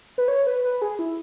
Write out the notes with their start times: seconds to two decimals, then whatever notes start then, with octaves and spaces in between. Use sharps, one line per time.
0.18 B4
0.28 C#5
0.47 B4
0.64 B4
0.82 G#4
0.99 E4